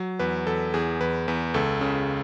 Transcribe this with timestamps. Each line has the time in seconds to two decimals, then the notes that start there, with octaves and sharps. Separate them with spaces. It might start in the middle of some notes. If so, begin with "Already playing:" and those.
Already playing: F#3
0.19 E2 B4
0.47 E2 A4
0.74 E2 G#4
1.01 E2 B4
1.28 E2 B4
1.54 C#2 A4
1.81 C#3